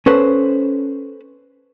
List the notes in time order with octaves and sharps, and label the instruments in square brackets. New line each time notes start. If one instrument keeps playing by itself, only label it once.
[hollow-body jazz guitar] C#4 A4 B4 C5